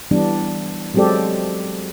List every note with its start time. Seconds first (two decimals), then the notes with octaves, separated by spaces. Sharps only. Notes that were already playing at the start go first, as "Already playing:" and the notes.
0.11 E3 G3 B3 D4
0.94 F#3 G#3 C4 G4 A4 D5